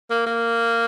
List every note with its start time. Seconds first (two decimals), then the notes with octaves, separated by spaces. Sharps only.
0.10 A#3
0.26 A#3